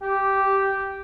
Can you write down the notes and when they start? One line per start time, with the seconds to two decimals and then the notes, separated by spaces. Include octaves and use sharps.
0.02 G4